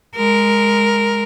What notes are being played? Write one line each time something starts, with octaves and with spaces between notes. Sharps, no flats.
G#3 A#4